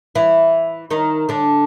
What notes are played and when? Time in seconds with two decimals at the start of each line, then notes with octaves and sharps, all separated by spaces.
0.15 E3 E4
0.90 D#3 D#4
1.29 D3 D4